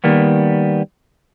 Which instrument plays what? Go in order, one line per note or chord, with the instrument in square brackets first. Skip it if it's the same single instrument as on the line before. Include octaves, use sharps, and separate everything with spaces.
[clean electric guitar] D#3 G3 A#3 B3